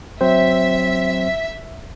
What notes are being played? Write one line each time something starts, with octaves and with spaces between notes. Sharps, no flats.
F#3 C4 C5 E5